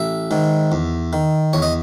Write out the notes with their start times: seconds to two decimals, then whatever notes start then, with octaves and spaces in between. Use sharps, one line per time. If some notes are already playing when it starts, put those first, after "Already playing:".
Already playing: A1 E5
0.31 G#2 D#3
0.72 E2
1.13 D#3
1.53 E2 C#5
1.62 D#5